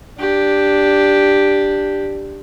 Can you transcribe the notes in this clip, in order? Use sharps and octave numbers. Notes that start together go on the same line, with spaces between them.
D4 G4